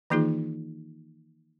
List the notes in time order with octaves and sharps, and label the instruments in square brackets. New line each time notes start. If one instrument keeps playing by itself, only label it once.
[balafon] D#3 E3 A#3 D#4 F4 G#4